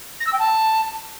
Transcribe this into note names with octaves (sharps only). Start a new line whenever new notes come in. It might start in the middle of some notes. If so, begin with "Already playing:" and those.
A#6
E6
G5
A5